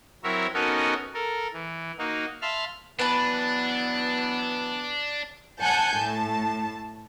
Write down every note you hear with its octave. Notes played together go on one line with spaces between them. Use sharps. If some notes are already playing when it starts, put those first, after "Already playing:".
F#3 C4 E4 A#4 C#5 E5
B3 C#4 D#4 F#4 A4 A#4
A4 A#4
E3
A#3 D#4 F#4
E5 F5 A5 B5 C6 F6
E3 F#3 B3 D4 B4 A5
F#5 G#5 A5 G6
A2 A5